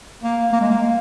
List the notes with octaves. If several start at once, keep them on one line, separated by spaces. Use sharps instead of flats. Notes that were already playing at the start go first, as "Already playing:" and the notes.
A#3
A#3
G#3
A#3